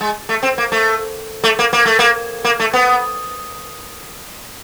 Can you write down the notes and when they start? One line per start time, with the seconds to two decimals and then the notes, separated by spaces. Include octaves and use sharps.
0.01 G#3
0.29 A3
0.43 C4
0.58 A#3
0.72 A3
1.44 A3
1.59 A#3
1.73 A#3
1.86 A3
1.99 A#3
2.44 A#3
2.60 A3
2.73 B3